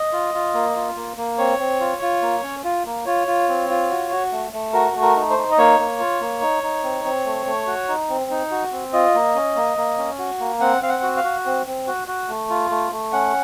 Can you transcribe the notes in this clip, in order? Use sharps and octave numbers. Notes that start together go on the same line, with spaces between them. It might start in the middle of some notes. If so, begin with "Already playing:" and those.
Already playing: D#5
F4
F4
A#3
F4
A#3
A#3
C4 C#5
C4
F4
F4
A#3
C#4
F4
A#3
F4 C#5
F4
C4
F4
F#4
F#4
A3
A3
F#4 A#4
A3
A#4
D#4
C5
D#4
D#5
A#3 C#5
A#3
F4
A#3
D#4
D#4
C4
C4
A3
A3
F#4
D#4
C4
D#4
F#4
C4
F4 D#5
A#3
C#4
A#3
A#3
C#4
F#4
A#3
C4 F#5
C4 F5
F#5
F#4
F5
F#4
C4
C4
F#4
F#4
A3
F4
A3
A3
C#4 F#5